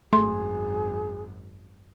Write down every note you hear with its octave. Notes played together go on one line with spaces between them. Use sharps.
G#1 F#2 A3 G#4 C6